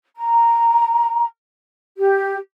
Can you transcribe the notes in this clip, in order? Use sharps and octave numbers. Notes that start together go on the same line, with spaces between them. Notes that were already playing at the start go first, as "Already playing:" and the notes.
A#5
G4